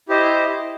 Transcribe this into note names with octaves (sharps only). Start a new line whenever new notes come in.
E4 G4 C5 D#5